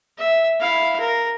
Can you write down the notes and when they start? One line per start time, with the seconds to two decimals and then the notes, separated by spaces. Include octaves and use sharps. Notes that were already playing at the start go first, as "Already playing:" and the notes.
0.19 E5
0.61 E4 F5
1.00 A#4